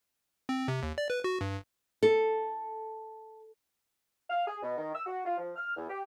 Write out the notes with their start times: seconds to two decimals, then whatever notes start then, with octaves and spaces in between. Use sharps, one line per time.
0.49 C4
0.68 C3
0.83 D#2
0.98 D5
1.10 B4
1.24 F#4
1.41 G2
2.03 A4
4.29 F5
4.46 G#4
4.63 B2
4.78 D#3
4.94 E6
5.06 F#4
5.25 F4
5.38 F3
5.56 F6
5.76 E2
5.89 G4